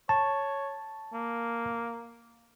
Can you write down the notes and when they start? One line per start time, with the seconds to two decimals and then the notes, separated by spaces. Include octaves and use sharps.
0.09 C#5 A5
1.13 A#3